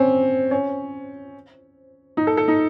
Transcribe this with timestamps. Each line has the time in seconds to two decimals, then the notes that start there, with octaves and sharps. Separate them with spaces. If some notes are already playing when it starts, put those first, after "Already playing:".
Already playing: C4 C#4
0.51 C#4
2.17 D#4
2.27 A4
2.37 A4
2.48 D#4